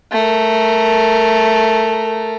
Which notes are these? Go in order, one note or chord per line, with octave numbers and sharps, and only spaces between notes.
A3 A#4